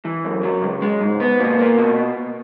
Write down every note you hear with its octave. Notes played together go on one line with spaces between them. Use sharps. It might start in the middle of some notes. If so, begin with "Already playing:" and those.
E3
F#2
F#3
C#2
G#3
G#2
B3
A#2
A#3
B2